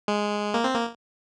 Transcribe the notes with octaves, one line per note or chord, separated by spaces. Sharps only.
G#3
A#3
C4
A#3